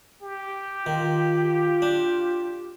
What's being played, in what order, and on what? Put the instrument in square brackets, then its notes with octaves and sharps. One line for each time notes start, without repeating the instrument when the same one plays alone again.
[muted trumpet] G4
[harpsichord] D#3 [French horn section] F4
[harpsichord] D4